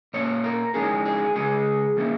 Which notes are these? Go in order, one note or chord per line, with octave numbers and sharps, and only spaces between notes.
A#2 A#3 C#4 C#5
A#4
D#3 G#3 C#4 G#4
G#4
C#3 G#3 C#4 G#4
D#3 A#3 C#4